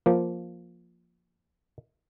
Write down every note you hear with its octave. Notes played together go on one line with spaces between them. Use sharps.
F3 A#3